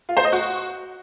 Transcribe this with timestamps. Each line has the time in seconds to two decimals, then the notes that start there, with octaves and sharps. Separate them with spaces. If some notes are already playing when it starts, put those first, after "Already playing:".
0.09 F4
0.17 C5
0.25 D#5
0.32 F#4